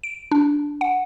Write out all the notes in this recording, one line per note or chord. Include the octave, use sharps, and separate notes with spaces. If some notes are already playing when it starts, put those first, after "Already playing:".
D7
D4
F#5